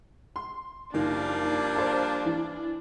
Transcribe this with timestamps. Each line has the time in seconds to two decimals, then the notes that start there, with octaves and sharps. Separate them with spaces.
0.36 C6
0.94 F#1 D#3 F3 G3 A#3 D4
1.76 C5 A5
2.25 E3